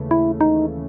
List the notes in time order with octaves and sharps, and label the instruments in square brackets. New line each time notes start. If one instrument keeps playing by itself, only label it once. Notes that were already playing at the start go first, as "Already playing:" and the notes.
Already playing: [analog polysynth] D#2 C#3 E3 A3
[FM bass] E4
D#4